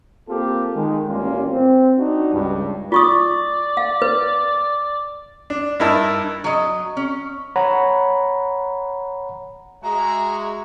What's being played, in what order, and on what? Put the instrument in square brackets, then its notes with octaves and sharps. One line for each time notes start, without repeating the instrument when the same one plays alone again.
[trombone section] A#3 C4 F4 G4 A4
D#3 G#3
A1 G2 G3 A#3 C#4 F4
C4
D4 D#4 F#4
C#2 G2
[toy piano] F4 C#6 D#6 [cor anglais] D5
[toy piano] F5
B4
[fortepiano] D4
G2 D#4 E4 A#4 A5
[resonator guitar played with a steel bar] F#3 D#5
C#4
[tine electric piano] C#5 F#5 A#5 B5
[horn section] G#3 F#4 E5 [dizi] A#5